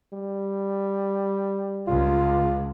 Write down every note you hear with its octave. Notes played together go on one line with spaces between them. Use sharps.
G3
C#2 G#3 F4